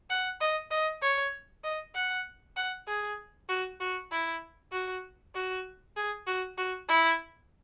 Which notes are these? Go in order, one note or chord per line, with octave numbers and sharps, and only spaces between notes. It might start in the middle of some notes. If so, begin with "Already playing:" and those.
F#5
D#5
D#5
C#5
D#5
F#5
F#5
G#4
F#4
F#4
E4
F#4
F#4
G#4
F#4
F#4
E4